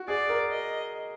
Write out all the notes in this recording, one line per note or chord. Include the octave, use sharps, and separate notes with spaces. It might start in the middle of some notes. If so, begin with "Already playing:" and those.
Already playing: F#4
G#4 D5
A#4
D#5